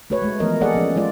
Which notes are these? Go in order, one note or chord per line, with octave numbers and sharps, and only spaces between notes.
A3 F#4 B4 C#5
G#3 A3
E3 F3 A3 B3 A#4 D#5
A#3 G#4 A4 D5 D#5 F#5
F3 C#4
F3 G#3 F4 D5